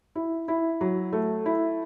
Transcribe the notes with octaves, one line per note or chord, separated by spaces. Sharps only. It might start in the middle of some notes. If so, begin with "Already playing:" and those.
E4
E4
F#3
A3
E4